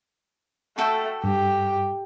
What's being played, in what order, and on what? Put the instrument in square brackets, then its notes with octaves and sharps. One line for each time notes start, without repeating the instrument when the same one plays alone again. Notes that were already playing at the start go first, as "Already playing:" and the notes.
[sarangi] A3 [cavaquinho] F#4 A4 G5
[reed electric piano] G2 [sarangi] G4